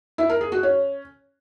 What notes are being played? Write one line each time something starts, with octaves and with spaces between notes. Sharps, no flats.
E4
A#4
G#4
F#4
C#4